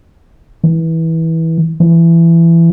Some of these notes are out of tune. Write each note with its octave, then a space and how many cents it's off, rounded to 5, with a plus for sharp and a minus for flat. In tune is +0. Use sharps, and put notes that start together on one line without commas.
E3 -20
E3 +20